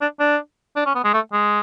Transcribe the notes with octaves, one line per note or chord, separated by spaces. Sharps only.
D4
D4
D4
C#4
B3
G#3
A3
G#3